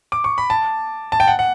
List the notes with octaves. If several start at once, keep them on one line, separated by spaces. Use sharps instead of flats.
D6
C#6
B5
A5
A5
G5
F#5
F#5